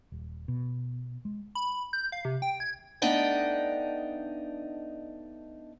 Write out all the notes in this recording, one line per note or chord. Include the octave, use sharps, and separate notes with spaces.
D#1
B2
G#3
B5
G6
F5
C3
G5
G#6
A3 B3 D4 D#4 D#5 G5